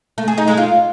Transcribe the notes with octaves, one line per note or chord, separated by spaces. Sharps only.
A3
G#4
D#4
G#3
F4